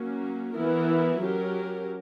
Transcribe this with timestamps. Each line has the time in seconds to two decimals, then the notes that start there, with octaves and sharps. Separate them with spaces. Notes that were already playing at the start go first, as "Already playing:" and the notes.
Already playing: F#3 A#3 C#4
0.55 E3 B3 E4 A#4
1.22 F#3 C#4 G4 A#4